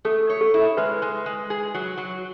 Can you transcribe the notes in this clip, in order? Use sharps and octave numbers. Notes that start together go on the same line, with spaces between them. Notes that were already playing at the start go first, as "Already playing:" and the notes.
A3 A4
C#5
A4
E4
G#3 B4
G#3
G#3
G#4
F#3
F#3